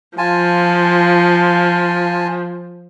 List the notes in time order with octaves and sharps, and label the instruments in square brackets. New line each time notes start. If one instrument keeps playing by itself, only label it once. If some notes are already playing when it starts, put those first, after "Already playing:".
[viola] F3 [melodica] F4 G#5 A5